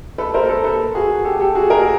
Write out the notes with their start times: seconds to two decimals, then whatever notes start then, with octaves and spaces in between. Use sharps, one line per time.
0.18 A4 B4
0.34 A#4 C5
0.49 A4 B4
0.64 A4 B4
0.95 F#4 G#4
1.24 G4 A4
1.40 G4 A4
1.55 F#4 G#4
1.70 G#4 A#4